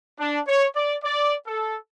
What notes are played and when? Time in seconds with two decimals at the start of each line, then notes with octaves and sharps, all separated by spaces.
0.19 D4
0.47 C#5
0.76 D5
1.04 D5
1.47 A4